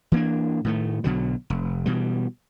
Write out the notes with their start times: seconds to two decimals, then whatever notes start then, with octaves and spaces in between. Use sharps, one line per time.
0.12 E3 A#3 D4
0.65 A2 D#3 A3
1.04 B1 B2 D3 F#3
1.50 F1
1.86 B2 E3 G3